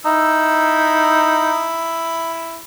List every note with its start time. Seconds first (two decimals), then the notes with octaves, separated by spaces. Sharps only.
0.05 D#4 E4 E6